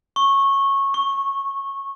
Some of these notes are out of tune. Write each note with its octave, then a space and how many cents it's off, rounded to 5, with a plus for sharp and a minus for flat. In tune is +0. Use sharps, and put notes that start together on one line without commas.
C#6 -15
C#6 +0